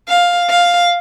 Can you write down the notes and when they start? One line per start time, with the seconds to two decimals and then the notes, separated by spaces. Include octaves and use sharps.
0.08 F5
0.50 F5